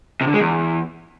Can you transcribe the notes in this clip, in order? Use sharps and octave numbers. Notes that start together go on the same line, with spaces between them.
C3
D3
G#3
E2